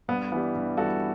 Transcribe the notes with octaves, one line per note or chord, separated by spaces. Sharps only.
G2 B3
E3 G3 B3
G2
E3 G3 F#4 A4